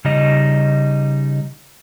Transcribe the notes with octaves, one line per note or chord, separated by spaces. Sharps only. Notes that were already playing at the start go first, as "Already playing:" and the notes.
C#3 G3 D#4 D#5